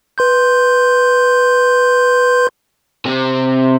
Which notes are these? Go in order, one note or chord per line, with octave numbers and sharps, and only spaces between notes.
B4 C6 G6
C3 C4